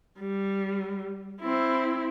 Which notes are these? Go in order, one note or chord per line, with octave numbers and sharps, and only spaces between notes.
G3
C4 E4